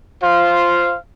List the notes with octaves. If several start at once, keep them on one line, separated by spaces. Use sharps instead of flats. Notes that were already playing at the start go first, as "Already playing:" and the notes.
F4 C5 F5